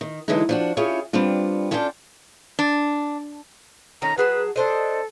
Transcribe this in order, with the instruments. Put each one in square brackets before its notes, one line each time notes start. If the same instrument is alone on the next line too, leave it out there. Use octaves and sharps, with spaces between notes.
[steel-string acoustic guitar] D#3
E2 D3 E3 F#3 G#3 D#4
F3 D4 F#4
C#4 E4 F4 G4 G#4 C#5
G3 B3 C4 D4 F4
C#4 D4 F4 A4 D5 G5
[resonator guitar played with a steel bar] D4
[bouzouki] D#3 A3 C#4 [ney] A#5
[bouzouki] F#3 G#4 A5 [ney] B4
[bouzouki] D4 C5 D#5 [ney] A4